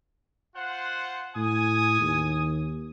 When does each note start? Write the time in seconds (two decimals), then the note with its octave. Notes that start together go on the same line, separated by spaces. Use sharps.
0.55 F4 C5 F#5
1.36 A2 G#5 D#6
2.01 D#2